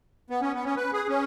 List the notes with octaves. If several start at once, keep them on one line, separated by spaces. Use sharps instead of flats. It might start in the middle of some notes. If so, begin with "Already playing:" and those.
B3
C#4
B3
C#4
B4
G#4
C#4